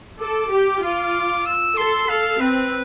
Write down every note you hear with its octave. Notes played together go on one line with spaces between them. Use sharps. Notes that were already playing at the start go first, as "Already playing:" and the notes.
A4 D6
G4
F4 D6
E6
A4 C6
A4 F5
C4 B4